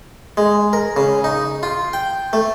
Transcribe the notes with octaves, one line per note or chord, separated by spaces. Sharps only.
G#3
A#4
C#3
D#4
F4
G5
A3